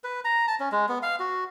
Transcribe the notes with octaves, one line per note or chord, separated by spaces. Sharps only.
B4
A#5
A5
C#4
G#3
B3
F5
F#4